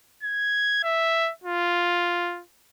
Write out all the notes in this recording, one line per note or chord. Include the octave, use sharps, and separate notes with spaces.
G#6
E5
F4